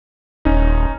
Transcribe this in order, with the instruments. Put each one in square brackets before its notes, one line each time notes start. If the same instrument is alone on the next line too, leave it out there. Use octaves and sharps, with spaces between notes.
[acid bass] D#1 [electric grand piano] C#4 D#4